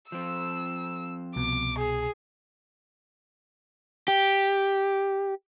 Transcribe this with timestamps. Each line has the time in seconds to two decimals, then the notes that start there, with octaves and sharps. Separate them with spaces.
0.12 F3 C4 E6
1.36 C2 B2 D6
1.78 G#4
4.08 G4